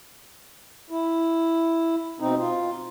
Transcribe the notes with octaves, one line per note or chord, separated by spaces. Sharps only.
E4
B2 C4 D#4
F4